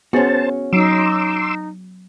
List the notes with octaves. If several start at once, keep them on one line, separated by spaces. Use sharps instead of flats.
B3 C#4 F#4 G#4 C5 A5
F#3 D#4 C6 D6 E6